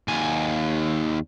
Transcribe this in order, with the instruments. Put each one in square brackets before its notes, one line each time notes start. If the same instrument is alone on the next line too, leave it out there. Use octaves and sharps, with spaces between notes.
[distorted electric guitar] D#2 G#5